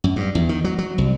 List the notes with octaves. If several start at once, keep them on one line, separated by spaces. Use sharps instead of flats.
F#2
G2
E2
D#3
F#3
F#3
C2